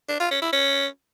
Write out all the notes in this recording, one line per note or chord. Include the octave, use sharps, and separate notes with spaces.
D4
F4
C#4
E4
C#4